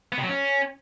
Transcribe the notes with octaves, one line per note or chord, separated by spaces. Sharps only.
B3
C3
F#3
C#4